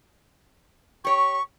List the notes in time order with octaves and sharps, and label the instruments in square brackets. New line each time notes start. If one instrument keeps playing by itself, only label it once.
[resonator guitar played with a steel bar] G4 C#5 [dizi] C#6